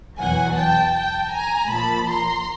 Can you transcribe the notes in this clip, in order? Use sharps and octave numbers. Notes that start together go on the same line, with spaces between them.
E2 B2 F#3 F#5 G#5
G5 A5
G5 A5
G#5 A#5
A#2 F3 A5 B5
A#5 C6